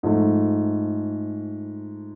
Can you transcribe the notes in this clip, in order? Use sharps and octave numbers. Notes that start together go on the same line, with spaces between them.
G#2 F3 A3